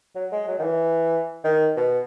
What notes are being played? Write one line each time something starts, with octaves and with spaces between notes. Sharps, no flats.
F#3
G#3
F#3
D#3
E3
D#3
B2